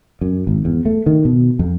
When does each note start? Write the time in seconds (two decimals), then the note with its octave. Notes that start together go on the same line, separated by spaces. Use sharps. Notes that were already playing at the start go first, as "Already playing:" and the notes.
0.21 F#2
0.47 G#1
0.65 E2
0.85 A3
1.06 D#3
1.25 B2
1.59 F2